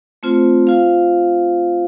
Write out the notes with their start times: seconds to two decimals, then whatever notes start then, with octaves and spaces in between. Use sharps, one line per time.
0.23 A3 C4 F4 C5
0.67 F4 C5 F5